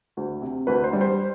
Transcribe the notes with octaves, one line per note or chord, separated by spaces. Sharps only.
D2
C3
D2 B4
C5
G3
C5